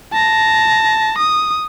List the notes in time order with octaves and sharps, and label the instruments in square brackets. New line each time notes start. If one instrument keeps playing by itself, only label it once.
[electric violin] A5 A#6
D#6